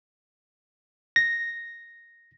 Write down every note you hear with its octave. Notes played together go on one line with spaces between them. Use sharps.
A#6